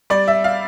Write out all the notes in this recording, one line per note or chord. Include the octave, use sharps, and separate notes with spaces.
G3 D5
E5
F5